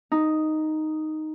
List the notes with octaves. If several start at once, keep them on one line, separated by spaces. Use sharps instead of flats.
D#4